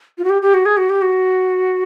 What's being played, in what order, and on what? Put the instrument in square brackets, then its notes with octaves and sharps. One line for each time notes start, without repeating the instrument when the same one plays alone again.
[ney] F4
F#4
G4
G4
F#4
G#4
F#4
G4
F#4